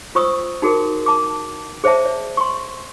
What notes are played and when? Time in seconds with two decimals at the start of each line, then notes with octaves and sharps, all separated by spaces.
0.15 F4 C5 C#6 D#6 E6
0.62 D#4 F#4 G#4 A#4
1.06 A5 D6
1.84 G#4 C5 D5 E5 A5
2.06 D5
2.37 C6 C#6